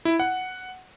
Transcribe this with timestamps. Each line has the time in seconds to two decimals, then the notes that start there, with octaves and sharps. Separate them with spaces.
0.05 E4
0.20 F#5